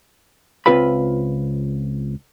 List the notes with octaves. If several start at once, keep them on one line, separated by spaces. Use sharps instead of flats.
C#2 C4 F4 B4 E5 B5